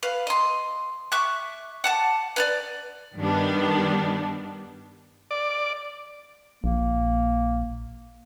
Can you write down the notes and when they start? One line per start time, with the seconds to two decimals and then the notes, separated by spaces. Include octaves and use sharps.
0.03 B4 F5
0.27 D#5 C6
1.12 E5 C#6 D6 F#6
1.84 F#5 A5 D6
2.36 B4 C#5 D5
3.18 G2 D#3 G3 B3 D4
5.31 D5
6.64 A#1 A#3